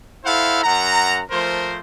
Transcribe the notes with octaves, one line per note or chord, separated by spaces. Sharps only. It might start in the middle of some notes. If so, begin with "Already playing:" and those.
E4 A4 C5 F5 F#5
F#2 F#5 A#5
F3 A3 A#4 C5